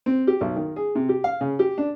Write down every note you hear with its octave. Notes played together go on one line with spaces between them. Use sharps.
C4
G4
B1
D#3
G#4
C3
G4
F5
C#3
G4
D4